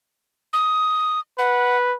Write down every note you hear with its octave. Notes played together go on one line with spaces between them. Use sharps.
D#6
B4 F#5